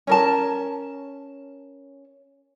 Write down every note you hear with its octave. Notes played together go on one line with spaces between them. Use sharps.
C#4 A#4 A5